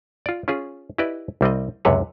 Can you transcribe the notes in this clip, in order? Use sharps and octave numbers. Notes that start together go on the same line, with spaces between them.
F4 D5
C#4 F4 G#4
E4 G4 B4 D5 D#5
C2 G3 C4 D#5
C#2 F#2 C3 B4 C#5